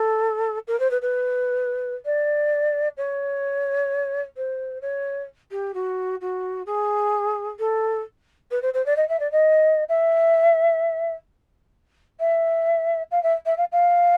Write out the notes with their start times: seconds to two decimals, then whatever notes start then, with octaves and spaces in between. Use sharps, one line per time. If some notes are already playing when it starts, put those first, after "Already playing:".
Already playing: A4
0.68 A#4
0.80 C5
0.91 B4
1.02 B4
2.06 D5
2.97 C#5
4.37 C5
4.82 C#5
5.51 G4
5.74 F#4
6.21 F#4
6.66 G#4
7.59 A4
8.51 B4
8.62 C5
8.74 C5
8.86 D5
8.97 D#5
9.09 E5
9.20 D5
9.32 D#5
9.89 E5
12.20 E5
13.11 F5
13.23 E5
13.46 E5
13.58 F5
13.72 F5